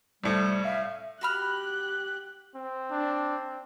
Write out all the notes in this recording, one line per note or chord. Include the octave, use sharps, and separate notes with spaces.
C2 A2 G3 A4
E5 F5 G#5
F#4 G4 B5 F6 F#6
C4
D4